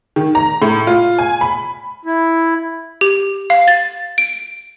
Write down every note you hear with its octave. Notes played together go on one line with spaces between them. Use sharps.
D#3
A#5
A2
F4
G#5
B5
E4
G4
F5
A6
D7